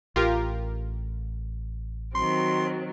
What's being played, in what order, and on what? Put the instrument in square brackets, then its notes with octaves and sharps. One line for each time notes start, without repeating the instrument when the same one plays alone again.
[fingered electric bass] A1 [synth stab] F4 G4 A#4
[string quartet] D#3 F#3 C4 [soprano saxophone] C6